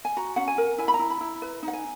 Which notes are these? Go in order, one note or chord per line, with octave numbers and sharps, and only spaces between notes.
G#5
F#4 A#5
C#4 F#5
G#5
A#4
E4 G#5
B5
A#5
E4
B5
E4
B4
D#4
F#5
G#5